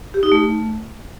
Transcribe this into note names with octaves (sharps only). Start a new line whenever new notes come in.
G4
D#4
A3